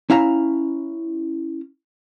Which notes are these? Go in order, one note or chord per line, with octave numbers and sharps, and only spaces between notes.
C#4 E4 F5 A#5